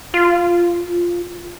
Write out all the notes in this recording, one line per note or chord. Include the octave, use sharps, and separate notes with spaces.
F4